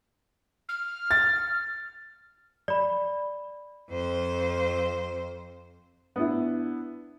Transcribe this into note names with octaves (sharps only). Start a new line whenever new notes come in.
F6
A6
D5 B5
F2 C5
B3 D4 E4